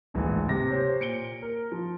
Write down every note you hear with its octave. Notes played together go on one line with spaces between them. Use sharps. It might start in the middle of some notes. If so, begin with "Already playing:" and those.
D1 A#1 G#2 E3
C3 G4 A#6
G4 C5 C#5
A#2 C#7 D7 G7
A#4
F3